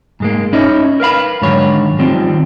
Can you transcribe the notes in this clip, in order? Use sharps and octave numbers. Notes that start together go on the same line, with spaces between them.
G#2 G#3 A#3
C#4 D#4 E4 C#5 D#5
A#4 B4 F5 B5
G#2 D3 D#3 F#3 C#5
D#3 F3 G3 C4